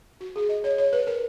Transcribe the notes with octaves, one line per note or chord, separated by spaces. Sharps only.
F#4
G#4
D#5
C#5
C#5
B4
A#4